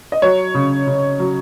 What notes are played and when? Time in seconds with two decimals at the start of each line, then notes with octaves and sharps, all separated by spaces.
0.12 D#5
0.22 F#3 C#5
0.55 C#3
0.87 C#3
1.20 F#3